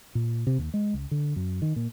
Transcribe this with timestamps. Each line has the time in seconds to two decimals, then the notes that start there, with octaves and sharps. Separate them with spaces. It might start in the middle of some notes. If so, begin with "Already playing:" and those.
0.15 A#2
0.47 C3
0.58 D#2
0.74 G#3
0.94 C#2
1.11 D3
1.36 F#2
1.62 D#3
1.76 A#2